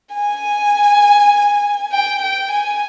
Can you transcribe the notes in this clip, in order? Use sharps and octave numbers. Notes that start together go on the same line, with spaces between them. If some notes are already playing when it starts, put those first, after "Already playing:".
G#5
G5
G5
G#5